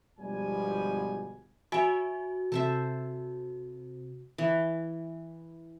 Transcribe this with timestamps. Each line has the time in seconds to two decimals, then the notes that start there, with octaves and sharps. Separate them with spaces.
0.19 G1 B2 F3 G3 G#3 G#5
1.72 F#4 C#5 E5 G#5
2.52 C3 A4 C5 E5
4.38 E3